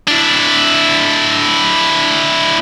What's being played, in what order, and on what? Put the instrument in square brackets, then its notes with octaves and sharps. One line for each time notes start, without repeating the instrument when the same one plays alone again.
[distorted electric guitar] D4 E4